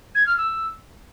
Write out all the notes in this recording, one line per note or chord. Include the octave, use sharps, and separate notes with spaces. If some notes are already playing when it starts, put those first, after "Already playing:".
G#6
F6
E6